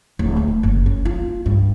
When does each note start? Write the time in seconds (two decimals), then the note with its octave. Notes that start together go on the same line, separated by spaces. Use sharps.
0.19 D1
0.37 A3
0.63 F#1
0.86 C#4
1.05 F4
1.46 G2